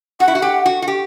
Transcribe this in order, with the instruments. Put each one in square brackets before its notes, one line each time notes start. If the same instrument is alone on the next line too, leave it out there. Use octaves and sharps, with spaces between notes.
[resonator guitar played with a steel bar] F#4 [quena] F#5
[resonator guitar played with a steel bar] E4
F#4
G4
F#4
F#4
G4